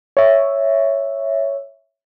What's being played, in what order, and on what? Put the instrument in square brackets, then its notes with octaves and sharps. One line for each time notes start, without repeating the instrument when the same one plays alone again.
[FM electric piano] C#5 E5